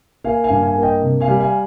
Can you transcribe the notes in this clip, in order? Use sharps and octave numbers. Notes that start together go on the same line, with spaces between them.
A#3 F5 G#5
F5 G#5
G2
F5 G#5
A#3
D#5 G5
C3
F5 G#5
G3
F5 G#5